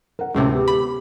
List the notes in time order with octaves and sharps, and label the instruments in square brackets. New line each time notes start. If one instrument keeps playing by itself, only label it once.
[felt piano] A#4 F#5
[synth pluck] D2 A2 C3 [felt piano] G#3 [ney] C#4
[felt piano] B3 [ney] G4
[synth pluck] B5